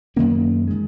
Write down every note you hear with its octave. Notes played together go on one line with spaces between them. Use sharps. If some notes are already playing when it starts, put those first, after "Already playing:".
F#2 D#3 A#3 C#4
D#3 G#3